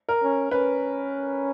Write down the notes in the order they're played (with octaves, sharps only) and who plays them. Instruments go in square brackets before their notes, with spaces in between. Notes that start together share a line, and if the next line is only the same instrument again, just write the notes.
[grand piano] A#4
[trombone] C#4
[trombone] C#4 [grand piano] B4